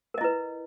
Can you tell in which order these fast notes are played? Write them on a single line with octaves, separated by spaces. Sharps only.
A#4 D#5 E4 B4